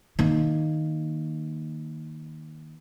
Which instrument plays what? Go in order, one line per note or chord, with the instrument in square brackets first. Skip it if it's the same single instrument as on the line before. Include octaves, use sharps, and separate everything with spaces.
[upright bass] D#3 A#3